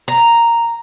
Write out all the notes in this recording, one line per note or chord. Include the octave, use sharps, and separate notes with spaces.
A#5